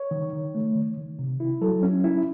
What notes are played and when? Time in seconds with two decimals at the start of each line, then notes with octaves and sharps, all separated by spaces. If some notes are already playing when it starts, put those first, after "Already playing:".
Already playing: C#5
0.11 D#3
0.33 D#3
0.55 A3
0.76 D#3
0.97 D#3
1.19 C3
1.40 E4
1.61 F#3 A4
1.83 C#4
2.04 E4